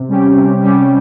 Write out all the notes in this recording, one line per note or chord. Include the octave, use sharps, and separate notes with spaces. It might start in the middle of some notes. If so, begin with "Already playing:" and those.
Already playing: C3
G3 C#4 G4
C3
G3 C#4 G4